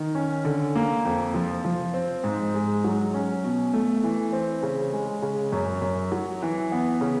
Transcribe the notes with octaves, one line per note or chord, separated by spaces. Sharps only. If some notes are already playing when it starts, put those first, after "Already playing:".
Already playing: D#3
C#4
D3
A#3
F2
F3
F3
C4
G#2
G#3
F#3
C#4
B2
A3
E3
C4
C#3
G#3
C#3
F#2
F#2
F#3
E3
B3
C#3